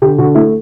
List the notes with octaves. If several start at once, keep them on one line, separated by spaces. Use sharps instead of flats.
D3 G4
D3 F#4
A3 E4